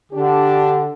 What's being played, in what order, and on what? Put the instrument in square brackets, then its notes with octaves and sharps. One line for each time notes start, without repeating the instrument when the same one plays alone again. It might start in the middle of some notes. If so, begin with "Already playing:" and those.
[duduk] D3 [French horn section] D4 G4